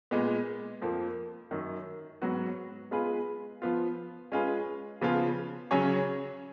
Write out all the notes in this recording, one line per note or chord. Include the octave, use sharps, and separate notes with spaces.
A#2 G#3 B3
F2 F3 A#3
F#2 D#3 F#3
G#2 F#3 B3 F#4
G#3 B3 F4 G#4 B4
F3 B3 F4
G#3 C#4 F4 G#4 B4
C#3 F3 B3 F4 G#4
C#3 F#3 C#4 G#4 C#5